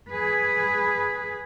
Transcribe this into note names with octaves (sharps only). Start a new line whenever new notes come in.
G#4 B4